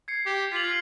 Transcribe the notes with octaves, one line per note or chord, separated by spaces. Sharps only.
G#6 C7 C#7
G4
F4 B6 C7 F#7
F6 B6 C7